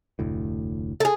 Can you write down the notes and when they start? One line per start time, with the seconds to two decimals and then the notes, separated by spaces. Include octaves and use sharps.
0.19 F1 D2 A2
1.00 G#4 A4